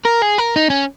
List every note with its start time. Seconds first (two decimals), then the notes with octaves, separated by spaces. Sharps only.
0.05 A#4
0.22 G#4
0.38 A#4
0.56 D#4
0.70 C#4